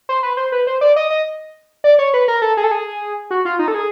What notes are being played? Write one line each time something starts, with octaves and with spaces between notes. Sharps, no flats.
C5
B4
C5
B4
C5
D5
D#5
D#5
D5
C#5
B4
A#4
A4
G#4
A4
G#4
F#4
F4
D#4
A4
G#4